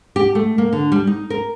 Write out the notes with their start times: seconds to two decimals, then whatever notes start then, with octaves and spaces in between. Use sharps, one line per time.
0.16 G4
0.35 A3
0.58 A#3
0.73 D3
0.92 G3
1.07 D#4
1.30 A#4